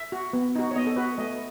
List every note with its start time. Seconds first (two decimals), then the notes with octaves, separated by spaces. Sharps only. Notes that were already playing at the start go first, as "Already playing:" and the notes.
Already playing: E5
0.12 F#4
0.33 B3
0.56 D#4 F#4
0.71 C#5
0.76 B3 D#5
0.87 A4
0.96 F#4 B4
1.18 A3 D#5